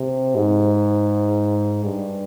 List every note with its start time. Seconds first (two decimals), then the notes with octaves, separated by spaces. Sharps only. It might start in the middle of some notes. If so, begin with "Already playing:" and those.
Already playing: C3
0.36 G#2
1.84 G2